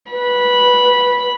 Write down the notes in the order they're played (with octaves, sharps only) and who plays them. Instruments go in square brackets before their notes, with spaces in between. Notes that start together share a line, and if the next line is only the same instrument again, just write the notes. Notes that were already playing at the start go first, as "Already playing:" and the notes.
[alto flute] B4 [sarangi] B5